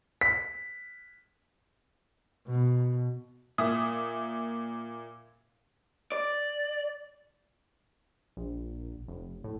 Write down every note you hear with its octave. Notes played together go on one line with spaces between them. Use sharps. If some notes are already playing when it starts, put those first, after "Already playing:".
B6
B2
A#2 E5 D#6
D5
A#1
F1
A2